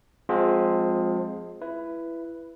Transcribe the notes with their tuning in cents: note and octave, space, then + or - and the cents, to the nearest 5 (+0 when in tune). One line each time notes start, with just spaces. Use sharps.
F3 +30 G#3 +10 C4 +0
E4 +15 B4 +0